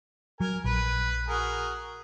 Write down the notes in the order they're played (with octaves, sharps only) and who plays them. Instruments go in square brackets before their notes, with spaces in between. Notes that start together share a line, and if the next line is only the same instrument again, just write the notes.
[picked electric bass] F#3 [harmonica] A#4 G#5
[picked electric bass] A#1 [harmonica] B4
[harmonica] F#4 G#4 A#4